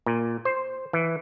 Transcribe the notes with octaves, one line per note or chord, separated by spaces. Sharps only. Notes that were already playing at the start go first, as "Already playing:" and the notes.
A#2
C5
E3